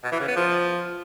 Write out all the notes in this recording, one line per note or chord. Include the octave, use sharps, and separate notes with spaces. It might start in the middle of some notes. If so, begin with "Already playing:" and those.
B2
E3
C#3
B3
F3